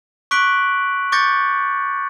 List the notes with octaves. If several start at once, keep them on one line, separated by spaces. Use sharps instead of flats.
C#6 D6 F#6 B6 D7 F#7
C#6 D6 G6 A6 A#6 C#7